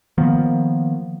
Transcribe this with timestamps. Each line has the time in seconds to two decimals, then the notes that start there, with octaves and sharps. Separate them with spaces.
0.18 D#3 F3 A#3 B3